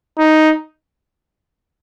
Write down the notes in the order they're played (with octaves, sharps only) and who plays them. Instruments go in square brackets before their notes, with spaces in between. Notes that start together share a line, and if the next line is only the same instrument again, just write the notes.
[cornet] D#4